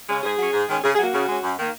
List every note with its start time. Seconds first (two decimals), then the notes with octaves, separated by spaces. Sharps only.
0.09 C#3 G#3 C#4
0.23 G#2 G#4
0.38 F#3 C#4
0.53 G#2
0.69 D#3 G#3 C#4
0.83 C#3 G#4
0.94 G#4
0.98 F#3 A#3 F#4
1.14 C#3
1.28 G#3 C#4
1.44 F#2
1.58 D#3 A#3